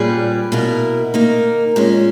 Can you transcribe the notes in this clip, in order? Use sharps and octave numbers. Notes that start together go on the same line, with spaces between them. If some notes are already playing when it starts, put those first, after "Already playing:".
Already playing: A#2 G3 C#4 G#4 B4
B2 A#3 E4 A#4
D#3 A#3 D#4
A#2 G#3 C#4